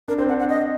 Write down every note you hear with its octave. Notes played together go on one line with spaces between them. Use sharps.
D4 A#4
C4 C5
D4 F#5
F#5
D#5